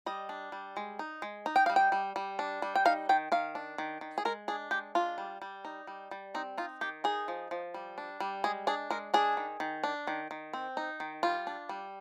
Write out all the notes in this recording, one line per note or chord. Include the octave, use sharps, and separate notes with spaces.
G3 D#5
D4
G3
G#3
D#4
G#3
D#4
G5
G3 F5
G5
G3
G3
D4
G3
G5
D#4 F5
D#3 G5
D#3 F5
D4
D#3
D#3
G#4
G#3 A#4
D4 G#4
G#3 G4
D4 F4
G3
G3
D#4
G3
G3
C4 D#4
D#4 F4
D#3 G4
D#4 G#4
F3
F3
G3
D4
G3
G#3 G#4
D4 G#4
G#3 A#4
D4 G#4
D#3
D#3
D4
D#3
D#3
C4
D#4
D#3
G3 F4
D4
G3